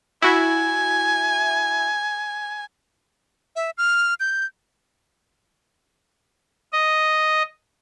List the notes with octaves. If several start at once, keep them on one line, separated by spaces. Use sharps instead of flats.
E4 F#4 E5 G#5
E5
F6
G6
D#5